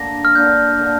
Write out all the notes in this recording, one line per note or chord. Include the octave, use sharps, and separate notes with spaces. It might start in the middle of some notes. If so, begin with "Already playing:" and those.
Already playing: D3 A#3 D4 A#6
F6
D3 A#3 D4 G6
D3 A#3 D4